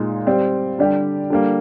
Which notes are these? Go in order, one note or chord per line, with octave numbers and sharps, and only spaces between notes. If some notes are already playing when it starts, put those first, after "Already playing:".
Already playing: A#2 G#3 D#4
G3 C4 G4 D5
D3 G3 D4 G4
D3 G3 A#3